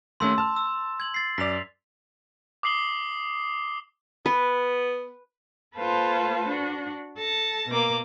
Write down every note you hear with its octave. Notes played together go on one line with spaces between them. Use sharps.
D#2 A3 C#4 C6 E6
A5 F6
E6
G#6 F#7
A6 C7
F#2 D5 B6 F7
D6 D#6 C7 F#7 G7
B3 B4
A#3 F4 A4 B4 C5 A5
D4 F#4
A4 A5 A#6
B2 A#3 D6